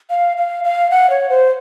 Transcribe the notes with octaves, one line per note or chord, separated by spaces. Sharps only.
F5
F5
F5
F#5
C#5
C5